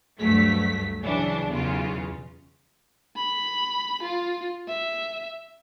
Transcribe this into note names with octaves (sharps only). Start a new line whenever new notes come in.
D2 G2 F#3 A3 B6
C#3 E3 F#3 D4
B1 E2 C#3 F4
B5
F4
E5